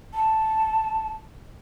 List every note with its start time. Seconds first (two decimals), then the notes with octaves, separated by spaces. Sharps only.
0.13 A5